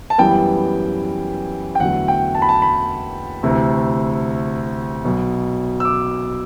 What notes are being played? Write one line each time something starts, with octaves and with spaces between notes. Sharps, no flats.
A5
F#2 E3 G3 B3 G5
G5
E2 D3 F#3 A3 F#5
G5
A5
B5
A5
B5
D2 C3 E3 A3
B1 B2 F#3
E6
D6